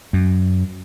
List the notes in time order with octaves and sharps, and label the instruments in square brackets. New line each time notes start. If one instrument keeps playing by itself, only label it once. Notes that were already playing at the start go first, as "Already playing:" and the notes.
[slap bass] F#2